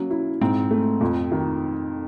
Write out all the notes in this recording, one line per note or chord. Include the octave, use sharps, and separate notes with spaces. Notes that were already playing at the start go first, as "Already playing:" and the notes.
Already playing: F#3 A#3 C#4
E4
G#2 C4
A3
F2
D#3